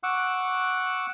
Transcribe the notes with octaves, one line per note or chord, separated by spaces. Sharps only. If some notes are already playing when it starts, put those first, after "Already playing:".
F#5 C#6 D6 E6 F#6